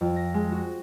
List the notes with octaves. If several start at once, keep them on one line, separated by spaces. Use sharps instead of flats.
F2
A#6
G#3
F#4